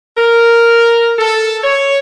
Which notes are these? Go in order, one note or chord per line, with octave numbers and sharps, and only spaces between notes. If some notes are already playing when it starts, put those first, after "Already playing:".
A#4
A4
C#5